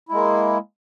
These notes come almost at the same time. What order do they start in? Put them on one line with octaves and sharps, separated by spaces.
E4 G#3 A#3